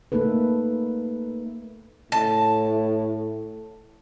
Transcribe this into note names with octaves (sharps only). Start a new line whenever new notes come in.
A3 A#3 D#4 A4 B4
A2 A5